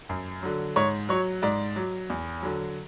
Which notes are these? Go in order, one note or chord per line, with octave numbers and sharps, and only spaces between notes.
F#2
D3 F#3
G#2 C#5
F#3 C#5
G#2 D5
F#3
E2
D3 F#3